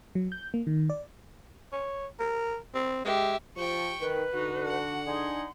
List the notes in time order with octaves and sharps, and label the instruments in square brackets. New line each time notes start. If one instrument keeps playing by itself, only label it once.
[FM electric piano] F#3
G6
A#3
D#3
D5
[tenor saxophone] C#5
A#4
C4
[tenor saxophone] G#3 [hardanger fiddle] G4 E5
[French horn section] F3 G4 [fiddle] G5 C#6
[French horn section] D#3 [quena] B4
[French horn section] D3 [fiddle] D#4 [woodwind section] F#4
[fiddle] F#5
[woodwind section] D4 D#4 G#4 [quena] C6